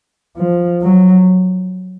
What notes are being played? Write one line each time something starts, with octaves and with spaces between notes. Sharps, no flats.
F3
F#3